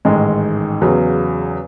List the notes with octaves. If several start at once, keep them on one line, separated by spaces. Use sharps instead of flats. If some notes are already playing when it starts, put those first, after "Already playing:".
A1 G#2 D#3 G#3
E2 C#3 F#3